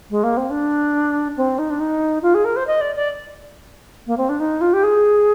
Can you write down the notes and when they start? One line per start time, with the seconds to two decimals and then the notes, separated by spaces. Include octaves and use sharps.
0.10 G#3
0.23 A#3
0.37 C4
0.50 D4
1.37 C4
1.58 D#4
1.70 D4
1.80 D#4
2.22 F4
2.34 G#4
2.44 A#4
2.56 C5
2.67 D#5
2.81 D5
2.95 D5
4.07 A#3
4.17 C4
4.29 D4
4.40 D#4
4.61 F4
4.73 G4
4.83 G#4